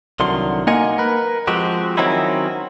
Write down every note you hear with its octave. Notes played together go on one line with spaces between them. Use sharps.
C2 D3 D#3 F#3 C6
A#3 D#4 A#4 D#5 F#5 G#5
A#4 B4
F3 G#3 C4 F#4 G4
D#3 F#3 C4 C#4 D#4 E4